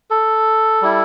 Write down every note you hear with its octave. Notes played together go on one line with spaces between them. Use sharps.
A4
G3 E4